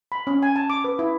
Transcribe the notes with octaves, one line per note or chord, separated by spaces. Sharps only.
B5
C#4
G#5
A5
D6
B4
E4